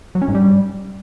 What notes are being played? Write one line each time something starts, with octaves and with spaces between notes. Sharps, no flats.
F#3
C#4
G#2
G3